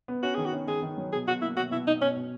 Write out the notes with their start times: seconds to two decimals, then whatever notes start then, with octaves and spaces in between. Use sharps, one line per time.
0.08 B3
0.23 C#4 F#4
0.35 D#3 G#4
0.46 F#4
0.53 C#4
0.67 D#3 G#4
0.82 D#3
0.98 F#3
1.12 B2 G#4
1.27 B2 F#4
1.42 A#3 E4
1.57 B2 F#4
1.71 B2 E4
1.87 B2 D#4
2.01 B2 C#4
2.16 B2